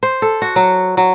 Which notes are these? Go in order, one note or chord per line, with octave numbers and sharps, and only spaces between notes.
C5
A4
F#4
F#3
F#3